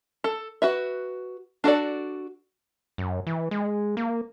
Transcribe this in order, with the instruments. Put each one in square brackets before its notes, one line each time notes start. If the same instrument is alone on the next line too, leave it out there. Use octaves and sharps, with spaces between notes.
[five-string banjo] A4
F#4 B4 E5
D4 F#4 A4 D5
[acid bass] F#2
E3
G#3
A#3